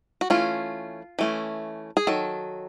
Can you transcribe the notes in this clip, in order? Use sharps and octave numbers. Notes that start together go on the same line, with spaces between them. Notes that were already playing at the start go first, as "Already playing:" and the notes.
F#4
E3 A3 C#4 F4
E3 A3 C#4
G#4
D#3 F#3 A4